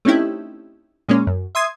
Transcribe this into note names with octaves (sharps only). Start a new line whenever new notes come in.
A3 C4 C#4 D#4 E4 G4
A#2 G#3 A#3 C#4
F#2
E5 C6 D#6 G#6